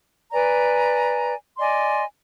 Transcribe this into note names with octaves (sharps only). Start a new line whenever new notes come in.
B4 D5 G#5 A#5
D5 D#5 G#5 C6